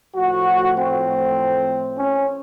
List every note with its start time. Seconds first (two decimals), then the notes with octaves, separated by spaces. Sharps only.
0.14 A2 F3 A3 F#4
0.74 C4
1.94 C#4